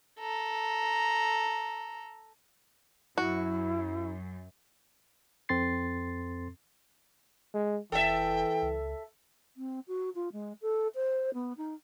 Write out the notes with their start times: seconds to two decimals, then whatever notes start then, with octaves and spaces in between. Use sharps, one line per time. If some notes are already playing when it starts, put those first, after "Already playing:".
0.20 A4 A#5
3.18 F#2 E4 F#4
5.49 F2 C4 A4 C6 A6 C7
7.54 G#3
7.92 F1 E3 A4 E5 G5
8.62 C#2
9.56 C4
9.87 F#4
10.15 F4
10.32 G#3
10.61 A4
10.95 C5
11.34 B3
11.57 D#4